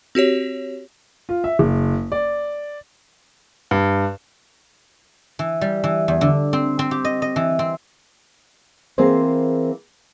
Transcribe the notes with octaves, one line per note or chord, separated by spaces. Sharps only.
C4 F#4 G4 C#5
F4
E5
F#1
D5
G2
E3
G3
E3
E2
D3
C4
C4
G4
D#5
D#5
E3
C4
E3 A#3 C4 G#4 C5